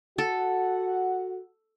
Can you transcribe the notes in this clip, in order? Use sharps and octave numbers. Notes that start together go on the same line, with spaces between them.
F#4 A4 F#5